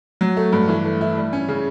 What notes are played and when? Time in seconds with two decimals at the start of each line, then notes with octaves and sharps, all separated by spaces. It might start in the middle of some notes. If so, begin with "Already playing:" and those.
0.21 F#3
0.37 A3
0.53 G2
0.68 E3
0.85 A3
1.01 E4
1.17 G3
1.33 C#4
1.49 C#3